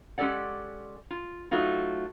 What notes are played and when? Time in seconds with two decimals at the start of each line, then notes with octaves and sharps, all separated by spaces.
0.18 G#3 C#4 G4 A4 D5 F#5
1.11 F4
1.51 F#3 A3 D#4 F4 F#4